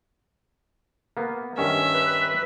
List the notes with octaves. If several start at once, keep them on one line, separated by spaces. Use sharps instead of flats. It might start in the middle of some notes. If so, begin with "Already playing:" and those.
A#3 B3
G2 D#3 C#4 E5
B4